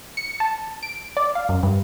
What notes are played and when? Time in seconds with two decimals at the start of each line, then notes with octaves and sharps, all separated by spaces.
0.17 C#7
0.40 A5
0.83 D7
1.17 D5
1.35 F5
1.49 F#2
1.63 G2